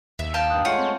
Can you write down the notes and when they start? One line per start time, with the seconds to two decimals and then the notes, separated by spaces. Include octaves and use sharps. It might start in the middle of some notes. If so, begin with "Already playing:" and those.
0.19 D#2 E5
0.34 F5 G5 A5 F6 G6
0.50 G2 D#6 F#6
0.65 G#3 A3 F4 C#5 F#5 G6
0.79 C4